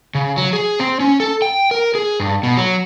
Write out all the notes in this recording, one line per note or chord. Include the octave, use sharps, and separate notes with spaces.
C#3
F#3
G#4
C4
C#4
A4
G5
A#4
G#4
G2
B2
F#3